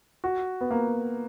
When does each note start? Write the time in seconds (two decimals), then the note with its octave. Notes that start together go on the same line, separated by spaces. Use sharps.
0.24 F#4
0.61 B3
0.71 A#3